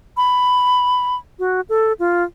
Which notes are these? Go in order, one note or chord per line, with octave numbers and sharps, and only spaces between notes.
B5
F#4
A4
F4